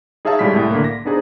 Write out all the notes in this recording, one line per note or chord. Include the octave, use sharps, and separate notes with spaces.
D#4 G#4 C#5 E5 F5 A5
A2 G3 G#3 E4 B6
C2 A2
D3 A#3
A#6
B3 D4 D#4 G#4 C5